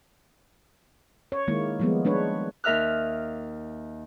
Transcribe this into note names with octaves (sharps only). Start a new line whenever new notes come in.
C#5
D#3 G#3 A#3 E4
F3 G3 G#3 A#3 B3
G#3 D4 B4 C#5
D#2 A#4 E5 F6 F#6